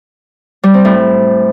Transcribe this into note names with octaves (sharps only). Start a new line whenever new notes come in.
G3
C4
A2